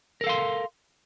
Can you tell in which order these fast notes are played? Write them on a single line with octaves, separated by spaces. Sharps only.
A#4 A4 F5 C6